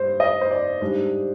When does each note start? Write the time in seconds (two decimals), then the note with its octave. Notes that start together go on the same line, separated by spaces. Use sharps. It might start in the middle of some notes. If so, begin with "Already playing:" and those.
Already playing: G2 C5
0.20 D#5
0.41 C5
0.51 D5
0.81 G#2 G3 D4 C5